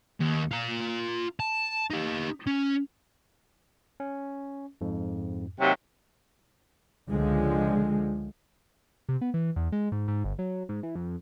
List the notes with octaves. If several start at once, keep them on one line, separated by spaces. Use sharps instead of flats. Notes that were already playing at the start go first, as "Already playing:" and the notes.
D#2
F4 A#5
A5
D#4 G4
C#4
C#4
F2 G#2
D#2 C3 F#3
C#2 D3 F3 G#3
C3
B3
E3
E2
G#3
G#2
G#2
G1
F#3
G#2
E3
F2